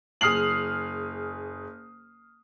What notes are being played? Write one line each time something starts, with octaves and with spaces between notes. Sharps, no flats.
F#1 G#4 D#6 F6 C7 F#7